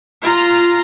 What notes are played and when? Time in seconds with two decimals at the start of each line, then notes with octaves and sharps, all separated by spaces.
0.23 F4 A#5